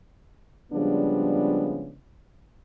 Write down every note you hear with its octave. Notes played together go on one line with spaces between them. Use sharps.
C#3 F3 G3 G#3 B3 D4